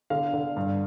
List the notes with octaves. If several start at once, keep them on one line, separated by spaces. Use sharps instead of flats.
D3 F5
D3
G2